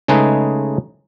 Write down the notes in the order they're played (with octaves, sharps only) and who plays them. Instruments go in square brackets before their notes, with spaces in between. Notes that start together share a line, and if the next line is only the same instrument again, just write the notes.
[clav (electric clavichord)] C#3 G#3 A3 D#4 G#4 B4